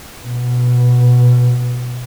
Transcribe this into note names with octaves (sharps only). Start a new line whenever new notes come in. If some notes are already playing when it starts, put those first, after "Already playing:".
B2